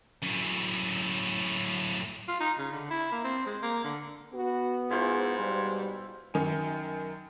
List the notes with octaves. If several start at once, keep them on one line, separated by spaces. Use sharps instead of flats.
F#2 A2
F4
D#4
C#3
D3
E4
A#3
C4
G#3
A#3
D3
B3 F#4
G#2 E4 F4 G#4 C5
B2 G3
F#2 D#3 G#5